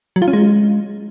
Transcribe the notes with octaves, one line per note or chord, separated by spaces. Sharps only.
F#3
F4
C#4
G#3